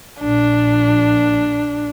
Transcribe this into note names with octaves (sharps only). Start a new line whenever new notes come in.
A#1 D4